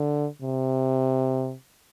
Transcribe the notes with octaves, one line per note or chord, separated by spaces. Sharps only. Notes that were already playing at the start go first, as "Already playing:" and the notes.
Already playing: D3
C3